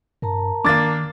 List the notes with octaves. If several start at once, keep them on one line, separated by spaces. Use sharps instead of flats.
G2 A#4 A5 A#5
D#3 A#3 D4 D6 A6